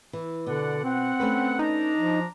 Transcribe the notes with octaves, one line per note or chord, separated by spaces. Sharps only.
E3
B2 D3 D5 F#5
C4 F#5
A3 C#4 B4
D4 D#4 A#5
F3